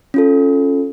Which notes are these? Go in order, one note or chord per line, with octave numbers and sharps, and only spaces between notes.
C#4 F4 A4